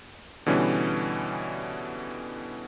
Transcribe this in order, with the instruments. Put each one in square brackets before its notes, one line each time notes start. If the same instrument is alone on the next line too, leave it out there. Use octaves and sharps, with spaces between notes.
[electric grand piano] B2 D3 E3 G3 C#4